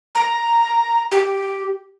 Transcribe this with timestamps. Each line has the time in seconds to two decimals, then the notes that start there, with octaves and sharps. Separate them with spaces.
0.15 A#5
1.11 G4